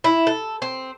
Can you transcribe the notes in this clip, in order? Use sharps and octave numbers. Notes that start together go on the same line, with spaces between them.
E4
A4
C4